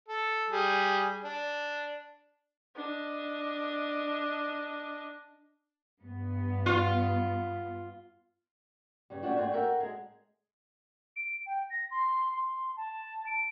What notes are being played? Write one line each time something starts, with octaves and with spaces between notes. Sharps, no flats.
A4
G3 G#4
D4
D4 D#5
G2 B3
F4
G2 C#3 G3
A#2 A3 C#4 D4 F#4 G4
G#2 A3 C4 D4 F#4 G#5
F#4 A4 A#4 E5 F#5 G5
G#3 G#4
D7
G5
A#6
C6
C6
A5
D7